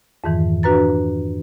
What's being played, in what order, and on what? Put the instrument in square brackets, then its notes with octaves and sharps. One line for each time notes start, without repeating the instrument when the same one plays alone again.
[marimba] F2 G#2 D#3 E3
D4 F#4 B4 A#5 A6